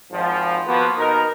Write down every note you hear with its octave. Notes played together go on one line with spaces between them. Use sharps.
G#1 F3
F3 A#3 B3 F#4 B4
B2 D#4 A#4